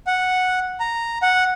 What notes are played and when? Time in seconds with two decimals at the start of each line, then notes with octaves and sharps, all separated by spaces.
0.07 F#5
0.80 A#5
1.22 F#5